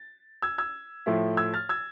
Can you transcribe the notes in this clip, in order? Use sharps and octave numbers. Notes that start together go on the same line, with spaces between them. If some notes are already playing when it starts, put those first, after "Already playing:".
Already playing: A6
E6 G#6
E6 G#6
A2 F3 A3 E4
E6 G#6
F6 A6
E6 G#6